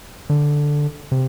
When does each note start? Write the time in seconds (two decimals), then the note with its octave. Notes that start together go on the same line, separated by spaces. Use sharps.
0.30 D3
1.12 C3